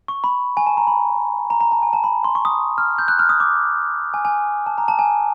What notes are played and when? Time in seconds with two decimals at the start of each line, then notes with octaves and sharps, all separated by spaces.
0.08 C#6
0.24 B5
0.57 G#5
0.67 A5
0.77 A#5
0.87 B5
1.50 A#5
1.61 A#5
1.72 A5
1.82 G#5
1.93 A5
2.04 B5
2.24 C6
2.35 C#6
2.45 D#6
2.78 F6
2.98 G6
3.08 F#6
3.19 F6
3.29 D#6
3.40 D6
4.14 G#5
4.25 G#5
4.66 A5
4.78 A#5
4.88 A5
4.99 G#5